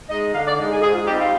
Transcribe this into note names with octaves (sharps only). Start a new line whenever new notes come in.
G#3 D#4 D#5
D3 F5
D5
G#3 D#4
G#4
G#2 G#4
F4
G3 C4 D#4 G4
F4